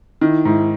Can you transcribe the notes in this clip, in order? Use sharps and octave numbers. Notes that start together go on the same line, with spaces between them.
D#3 E4
G#2 E4